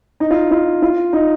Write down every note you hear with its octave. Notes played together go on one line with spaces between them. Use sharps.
D#4
F4
F4
F4
D#4